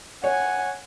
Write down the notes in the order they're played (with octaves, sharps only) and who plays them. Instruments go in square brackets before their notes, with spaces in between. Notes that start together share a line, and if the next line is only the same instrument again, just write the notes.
[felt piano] C#5 [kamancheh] F#5 G#5